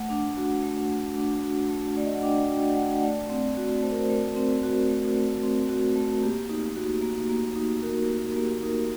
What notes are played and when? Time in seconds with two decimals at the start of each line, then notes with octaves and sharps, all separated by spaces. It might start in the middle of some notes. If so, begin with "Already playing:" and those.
Already playing: A3 F#5
0.10 D4
0.37 F#4
0.63 A3
0.90 A3
1.17 D4
1.44 F#4
1.69 A3
1.97 A3 D5
2.05 D#5
2.15 F#5
2.23 D4 G5
2.49 F#4 G5
2.76 A3 F#5
3.03 A3 D5
3.30 C4
3.57 F#4
3.83 A3 C5
3.91 A#4
3.99 C5
4.10 A3 A#4
4.36 C4
4.63 F#4
4.90 A3
5.16 A3
5.43 C4
5.69 F#4
5.96 A3
6.23 A#3 G4
6.49 D#4
6.76 F#4
7.02 A#3
7.29 A#3
7.56 D#4
7.83 F#4 A#4
8.09 A#3
8.36 A#3 G4
8.63 D#4 A#4